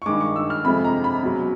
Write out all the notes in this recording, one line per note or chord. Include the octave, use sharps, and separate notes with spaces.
C#6
G2 D#3 G#3 D6
C#6
E6
F6
F2 C3 F3 G#3 C4 B5
A#5
B5
C#2 B2 F#3